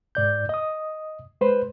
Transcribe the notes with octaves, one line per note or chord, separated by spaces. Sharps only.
G#2 D5 G6
D#5 D#6
G#3 B4 C5